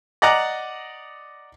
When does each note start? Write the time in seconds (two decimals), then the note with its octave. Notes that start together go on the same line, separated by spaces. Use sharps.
0.22 D5 D#5 F#5 A#5 D6